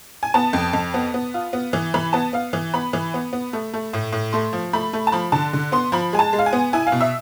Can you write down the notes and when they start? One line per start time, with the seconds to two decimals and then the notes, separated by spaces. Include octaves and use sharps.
0.23 G#5
0.34 B3 A5
0.53 F2
0.73 F2
0.94 B3
1.14 B3
1.34 F4
1.53 B3
1.73 E3
1.94 E3 B5
2.13 B3 A5
2.33 B3 F5
2.53 E3
2.74 B3 B5
2.93 E3
3.14 B3
3.33 B3
3.53 A3
3.74 A3
3.93 A2
4.12 A2
4.33 A3 C6
4.53 F3
4.73 A3 B5
4.93 A3
5.07 A5
5.12 F3 B5
5.32 D3 A5
5.53 D3
5.72 B3 C6
5.92 F3 B5
6.13 G#3 G#5
6.19 A5
6.33 G#3
6.39 F5
6.46 G#5
6.53 B3
6.73 E4 G#5
6.87 F5
6.92 B2
7.01 E5